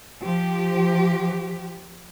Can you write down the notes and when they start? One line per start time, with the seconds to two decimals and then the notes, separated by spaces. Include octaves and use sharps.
0.23 F3 G4